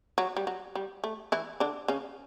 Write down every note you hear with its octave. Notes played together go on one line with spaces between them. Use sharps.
F#3
G3
F#3
G3
A3
E3 E4
D3 D4
C#3 C#4